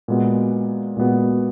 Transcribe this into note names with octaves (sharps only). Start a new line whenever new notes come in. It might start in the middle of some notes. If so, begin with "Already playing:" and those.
A#2 G#3 B3 F#4
A#2 G#3 B3 F#4